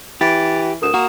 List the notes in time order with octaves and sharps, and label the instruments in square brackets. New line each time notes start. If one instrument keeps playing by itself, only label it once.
[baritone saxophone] E3 [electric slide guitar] G4 [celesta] A6 D7
[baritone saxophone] D2 [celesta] A#4 D#6 E7
[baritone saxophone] A#3 [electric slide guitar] F#4